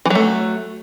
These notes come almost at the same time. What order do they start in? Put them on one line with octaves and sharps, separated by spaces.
E3 F#3 A3